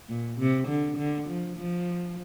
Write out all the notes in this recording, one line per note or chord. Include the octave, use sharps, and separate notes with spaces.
A#2
C3
D3
D3
F3
F3